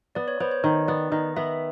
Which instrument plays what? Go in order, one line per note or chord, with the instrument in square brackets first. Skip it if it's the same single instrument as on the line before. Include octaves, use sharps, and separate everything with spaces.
[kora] B3 [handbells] D5
[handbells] C#5
[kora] B3 [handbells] C5
[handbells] C#5
[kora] D#3
[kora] B3 [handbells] D5
[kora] D#3 [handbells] D#5
[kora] B3 [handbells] E5